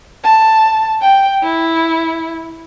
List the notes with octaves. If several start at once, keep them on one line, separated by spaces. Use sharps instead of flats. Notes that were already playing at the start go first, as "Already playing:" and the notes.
A5
G5
E4